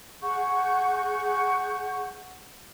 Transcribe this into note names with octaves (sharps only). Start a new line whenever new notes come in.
G#4 F#5 C#6 G6